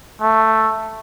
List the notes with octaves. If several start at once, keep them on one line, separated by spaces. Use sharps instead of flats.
A3